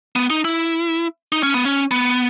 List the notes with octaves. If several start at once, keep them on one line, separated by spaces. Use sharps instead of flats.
B3
D#4
E4
D#4
C#4
B3
C#4
B3